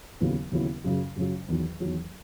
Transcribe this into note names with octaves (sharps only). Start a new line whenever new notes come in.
D#2 C#3 F#3 B3 E4
D#2 C#3 F#3 B3 E4
F#2 C#3 F#3
F#2 C#3 F#3
E2 D#3 F#3
E2 D#3 F#3